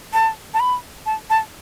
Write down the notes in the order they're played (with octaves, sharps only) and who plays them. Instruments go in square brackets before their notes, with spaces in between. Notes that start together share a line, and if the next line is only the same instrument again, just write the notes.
[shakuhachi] A5
A5
B5
A5
A5